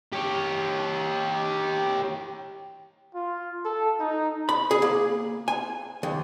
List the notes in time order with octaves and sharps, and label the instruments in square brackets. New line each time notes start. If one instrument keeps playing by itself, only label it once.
[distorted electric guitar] G4 C#5
[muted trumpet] F4
A4
D#4
[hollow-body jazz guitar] B5
G#4
A#3
G#5
D#2